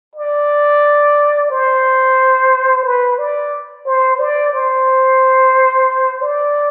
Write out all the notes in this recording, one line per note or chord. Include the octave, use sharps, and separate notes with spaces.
D5
C5
B4
D5
C5
D5
C5
D5